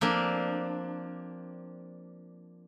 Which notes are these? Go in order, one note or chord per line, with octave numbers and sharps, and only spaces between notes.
F3 A#3 C4 D4